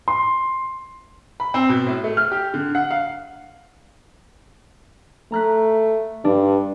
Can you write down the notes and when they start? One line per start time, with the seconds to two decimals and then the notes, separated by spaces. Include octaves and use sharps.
0.08 C6
1.40 B5
1.54 C4
1.69 B2
1.87 A2
2.04 A3
2.17 F6
2.32 G4
2.54 D3
2.75 F#5
2.91 F5
5.32 A3 A#5 F#6 B6
6.25 G2 D4